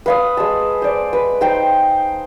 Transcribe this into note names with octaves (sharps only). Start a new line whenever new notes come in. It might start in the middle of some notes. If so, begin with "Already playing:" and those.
B4 F5 D#6
G#3 A5
C5 D5
B4
D#4 C5 G5